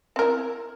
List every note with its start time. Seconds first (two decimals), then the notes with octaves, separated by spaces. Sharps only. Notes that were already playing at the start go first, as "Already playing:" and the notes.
0.16 C4
0.19 A#4
0.22 E4